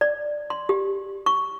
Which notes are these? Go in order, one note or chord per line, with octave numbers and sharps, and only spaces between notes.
D5
C6
G4
C#6